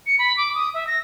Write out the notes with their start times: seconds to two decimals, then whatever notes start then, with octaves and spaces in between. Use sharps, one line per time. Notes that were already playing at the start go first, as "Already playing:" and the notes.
0.07 C#7
0.19 B5
0.37 D6
0.55 D#6
0.74 E5
0.87 A#6